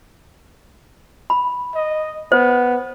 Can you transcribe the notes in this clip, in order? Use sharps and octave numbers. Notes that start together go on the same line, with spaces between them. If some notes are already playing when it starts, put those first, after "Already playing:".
B5
D#5
B3 C5